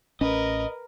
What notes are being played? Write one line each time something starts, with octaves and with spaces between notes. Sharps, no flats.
A1 C#4 A#4 B4 D#5